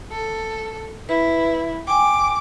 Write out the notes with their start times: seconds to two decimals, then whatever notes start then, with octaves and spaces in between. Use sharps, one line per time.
0.12 A4
1.09 E4 B4
1.87 G5 G#5 D6